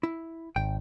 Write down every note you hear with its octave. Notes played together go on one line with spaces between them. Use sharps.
E4
G#1 G5